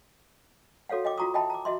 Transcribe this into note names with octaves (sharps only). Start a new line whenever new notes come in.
F#4 A4 C#5 F5 F#5
D#5 G5 D6
F4 F#4 A#5 C#6 D#6
D#5 E5 G5 A5 B5
A#5 D6
F#4 D#5 E5 C6